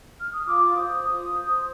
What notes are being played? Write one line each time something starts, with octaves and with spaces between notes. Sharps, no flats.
F6
D#6
F4 D6
C5 D#6
F4 D#6
C5